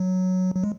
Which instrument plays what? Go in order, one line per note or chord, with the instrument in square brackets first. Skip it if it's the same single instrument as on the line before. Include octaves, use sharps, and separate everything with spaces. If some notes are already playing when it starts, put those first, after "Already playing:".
Already playing: [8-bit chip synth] F#3
F#3
G#3